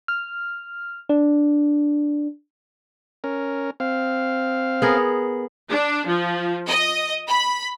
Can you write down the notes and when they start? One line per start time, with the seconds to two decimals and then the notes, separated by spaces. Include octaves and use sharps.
0.08 F6
1.09 D4
3.24 C#4 A#4
3.80 C4 F5
4.82 B3 G#4 A#4
5.69 D4
6.06 F3
6.67 D#5
7.28 B5